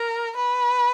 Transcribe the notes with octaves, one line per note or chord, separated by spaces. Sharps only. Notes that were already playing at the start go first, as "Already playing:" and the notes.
Already playing: A#4
B4